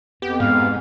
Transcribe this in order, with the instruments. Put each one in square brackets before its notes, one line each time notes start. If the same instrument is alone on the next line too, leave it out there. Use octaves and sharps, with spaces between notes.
[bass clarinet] F2 [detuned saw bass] B3 [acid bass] G4
[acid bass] G#2 [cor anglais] F5